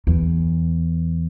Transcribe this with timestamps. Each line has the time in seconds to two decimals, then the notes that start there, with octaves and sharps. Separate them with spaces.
0.07 E2